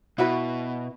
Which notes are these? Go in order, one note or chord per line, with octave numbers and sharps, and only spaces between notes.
B2 E4 F#4 B4